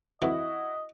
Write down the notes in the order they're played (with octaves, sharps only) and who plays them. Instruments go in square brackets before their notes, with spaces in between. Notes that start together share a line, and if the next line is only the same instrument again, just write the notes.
[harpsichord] F2 E3 [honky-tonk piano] E4 F#4 [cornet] D#5